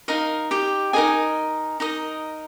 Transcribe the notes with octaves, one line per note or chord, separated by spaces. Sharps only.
D#4 A#4 D#5 F5
G4 G5
D#4 G#4 A#4 D#5 G#5
D#4 A#4 D#5